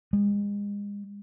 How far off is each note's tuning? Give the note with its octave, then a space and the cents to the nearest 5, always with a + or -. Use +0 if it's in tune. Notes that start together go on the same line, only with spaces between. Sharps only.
G#3 -35